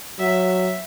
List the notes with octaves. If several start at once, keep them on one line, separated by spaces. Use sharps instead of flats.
F#3 E5